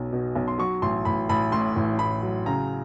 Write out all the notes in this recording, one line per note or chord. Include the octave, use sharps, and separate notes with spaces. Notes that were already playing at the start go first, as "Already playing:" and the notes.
Already playing: B1 F#3 B3
B2
B1
C6
F#3 C#6
A1 C6
A1 B5
A1 B5
A2 C6
A1
A2 B5
F#3
C#3 A#5